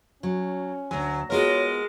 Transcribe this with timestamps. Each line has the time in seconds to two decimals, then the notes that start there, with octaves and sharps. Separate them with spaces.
0.23 F#3 C#4
0.91 D2 F#3 G#5
1.30 G#3 B3 F4 F#4 A#4 C#5